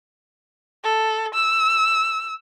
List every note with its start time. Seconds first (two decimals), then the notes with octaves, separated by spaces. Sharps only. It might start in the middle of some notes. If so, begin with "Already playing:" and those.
0.84 A4
1.34 E6